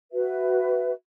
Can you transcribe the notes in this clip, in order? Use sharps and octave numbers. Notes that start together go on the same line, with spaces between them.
F#4 B4 E5